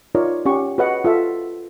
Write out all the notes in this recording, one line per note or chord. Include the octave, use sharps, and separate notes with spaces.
D#4 F4 A#4 C#5 D5
C#4 G4 F#5 C#6
F#4 G#4 B4 C#5 D#5 F#5
F4 A4 E5